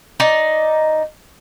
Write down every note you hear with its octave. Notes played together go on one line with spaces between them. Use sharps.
D#4 D5